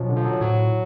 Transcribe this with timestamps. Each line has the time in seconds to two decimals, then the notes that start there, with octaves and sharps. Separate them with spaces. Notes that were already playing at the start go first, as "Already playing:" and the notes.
Already playing: B2 F3 F#3 C#4
0.09 D3
0.17 F3
0.25 F#3
0.41 A2 F#3